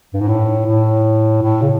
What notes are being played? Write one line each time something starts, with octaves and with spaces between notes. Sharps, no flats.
G2
G#2
A2
A2
A2
C#3